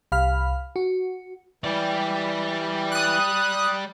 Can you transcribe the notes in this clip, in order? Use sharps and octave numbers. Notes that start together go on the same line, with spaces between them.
C2 F5 B5 F6
F#4
E3 G3 D5
D#6 F#6